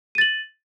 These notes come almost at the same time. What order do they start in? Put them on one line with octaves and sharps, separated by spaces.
D#7 A6 F#7